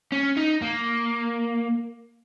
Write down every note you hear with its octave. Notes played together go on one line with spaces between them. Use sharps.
C#4
D#4
A#3